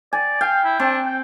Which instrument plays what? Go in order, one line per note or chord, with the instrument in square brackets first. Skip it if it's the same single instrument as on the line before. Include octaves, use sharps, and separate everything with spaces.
[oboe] D5 [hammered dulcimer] G#5
[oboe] F5 [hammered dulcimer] G5
[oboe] E4
[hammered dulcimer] C4 [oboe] D4
[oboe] G5